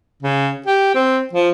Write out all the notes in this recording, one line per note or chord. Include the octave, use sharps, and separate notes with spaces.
C#3
G4
C4
F3